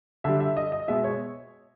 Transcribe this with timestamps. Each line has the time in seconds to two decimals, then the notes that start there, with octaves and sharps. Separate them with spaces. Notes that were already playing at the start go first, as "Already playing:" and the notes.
0.24 D3 G3 E5
0.40 E5
0.57 D#5
0.72 D#5
0.88 B2 G#3 E5
1.04 C#5